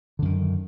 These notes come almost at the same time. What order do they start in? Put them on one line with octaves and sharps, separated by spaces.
D3 F#2 D#3